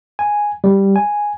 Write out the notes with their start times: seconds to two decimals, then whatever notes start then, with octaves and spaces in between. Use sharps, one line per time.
0.19 G#5
0.64 G3
0.96 G#5